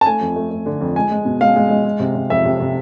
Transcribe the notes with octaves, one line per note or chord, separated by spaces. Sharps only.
A5
A3 G#5
F2
A3
A3
D3
F2
G#3 G#5
G#3
B2
G#3 F5
G#3
G#3
G#3
C3
C3
F2 E5
C3
C3